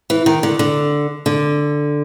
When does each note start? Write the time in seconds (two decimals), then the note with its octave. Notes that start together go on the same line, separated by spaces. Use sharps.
0.10 E3
0.26 D#3
0.43 D3
0.59 D3
1.26 D3